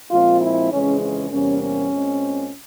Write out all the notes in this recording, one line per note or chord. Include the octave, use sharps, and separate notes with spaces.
A#2 F3 G#3 C4 F4
E4
F2 C#3 E3 G#3 C#4
C#4
E2 C3 G3 A#3 C#4
C#4
A#2 G#3 C4